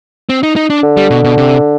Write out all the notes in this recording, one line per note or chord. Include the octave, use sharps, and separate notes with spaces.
C4
D#4
D#4
D4
D3
G3
B2
B2
C3